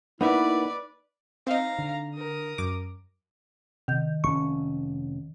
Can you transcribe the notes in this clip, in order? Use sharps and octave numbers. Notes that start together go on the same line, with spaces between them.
A#3 B3 D#4 E4 B4 D5 E5
C4 D#4 F5 A#5
D3
A#4 D#6
F#2 D6 D7
C3 D#3 G6
F1 C#4 C#6